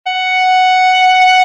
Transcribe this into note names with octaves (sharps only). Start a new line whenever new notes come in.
F#5